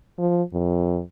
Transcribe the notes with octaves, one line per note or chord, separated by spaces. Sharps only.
F3
F2